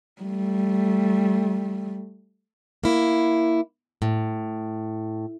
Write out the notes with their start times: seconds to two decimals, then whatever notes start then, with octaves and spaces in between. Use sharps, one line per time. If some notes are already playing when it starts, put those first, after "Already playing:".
0.22 G3 A3
2.84 A#3 E4
4.02 A2